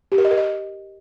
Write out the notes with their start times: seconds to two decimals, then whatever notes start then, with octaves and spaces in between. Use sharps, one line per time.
0.12 G4
0.18 A#4
0.25 D#5
0.31 A#4
0.38 D#5